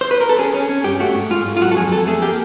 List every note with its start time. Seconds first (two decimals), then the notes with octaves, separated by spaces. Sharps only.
0.01 C5
0.11 B4
0.21 A#4
0.29 A4
0.39 C#4 G#4
0.54 C#4
0.69 C#4
0.84 G2 G4
1.00 A3 F#4
1.15 G#2
1.30 G#2 F4
1.46 G#2
1.57 F4
1.61 F#3 F#4
1.71 A4
1.76 F2 G#4
1.92 F2 A4
2.07 A3 G#4
2.22 A#3 G4